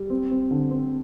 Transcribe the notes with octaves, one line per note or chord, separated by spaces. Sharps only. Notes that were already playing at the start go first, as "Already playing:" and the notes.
Already playing: G3
C4
C4
D3
C4